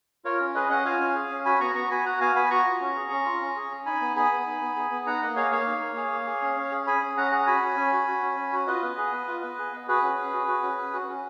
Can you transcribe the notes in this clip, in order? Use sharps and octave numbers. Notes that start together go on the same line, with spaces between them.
F4 A#4 C#5
C#4
G#4 B4 D#5
C#4 D#5 F#5
F4 F5 G#5
C#4
G#4
C#4
F#4 G#5 B5
B3 A#5 C#6
B3 A#5 C#6
F#4 G#5 B5
F#4 F#5 A#5
B3 F5 G#5
B3 G#5 B5
F#4 A#5 C#6
F4
C#4
G#4
C#4
F4
C#4
G#4
C#4
D#4 G#5 B5
B3
G#4 G#5 B5
B3
D#4
B3
G#4
B3
D#4 F#5 A#5
A#3 D#5 F#5
G#4 C#5 F5
A#3 C#5 F5
D#4
A#3
G#4
A#3
G#4
C#4
C#4
G#4
G#4 G#5 B5
C#4
C#4 F#5 A#5
G#4 F#5 A#5
F#4 G#5 B5
C#4
C#4
F#4
F#4
C#4
C#4
F#4
F4 B4 D#5
B3
G#4
B3
F4
B3
G#4
B3
F#4 G#4 B4
C#4
C#4
F#4
F#4
C#4
C#4
F#4
C#4